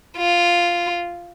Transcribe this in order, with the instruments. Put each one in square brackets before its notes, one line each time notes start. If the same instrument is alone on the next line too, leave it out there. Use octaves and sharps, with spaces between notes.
[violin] F4